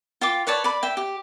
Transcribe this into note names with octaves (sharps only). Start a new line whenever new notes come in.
F4 G5 D6
B4 C#5 D5 A5
D5 B5
E5 G5
G4